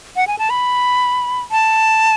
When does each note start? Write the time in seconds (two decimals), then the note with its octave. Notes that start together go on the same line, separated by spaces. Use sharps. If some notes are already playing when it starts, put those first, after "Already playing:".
0.16 F#5
0.27 G#5
0.39 A5
0.50 B5
1.51 A5